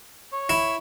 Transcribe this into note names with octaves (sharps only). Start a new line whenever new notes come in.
C#5
E4